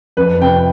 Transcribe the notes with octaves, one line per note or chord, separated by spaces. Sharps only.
F2 B4
C3 G5